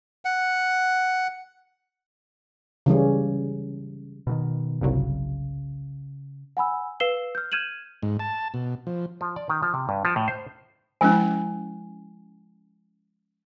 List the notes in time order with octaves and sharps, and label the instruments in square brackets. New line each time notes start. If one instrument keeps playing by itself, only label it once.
[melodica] F#5
[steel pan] C#3 E3 G3 C#4
[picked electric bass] B2 D3 D#3
[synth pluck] G1 C2 F#3 [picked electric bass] C#3
[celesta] F#5 G#5 B5 E6
B4 F5 E6 C7 E7 G7
F6 G6
F6 G6 G#6 D#7 E7 F#7
[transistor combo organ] G#2
A5
B2
F3
[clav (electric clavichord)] F3
D5
D#3
F3
C3
G2
F3
A2
C5
[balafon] F3 G#3 E4 [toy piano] C#4 G#5